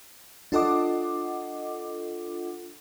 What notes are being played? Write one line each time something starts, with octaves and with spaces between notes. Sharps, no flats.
D4 F4 A4 D#5 F#5 D6